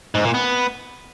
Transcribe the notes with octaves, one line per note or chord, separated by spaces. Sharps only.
G#2
A#2
B3